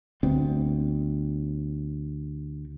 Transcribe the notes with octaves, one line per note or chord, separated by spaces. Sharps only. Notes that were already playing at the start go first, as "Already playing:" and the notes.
D2 B3 C4